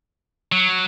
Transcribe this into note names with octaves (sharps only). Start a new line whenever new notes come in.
F#3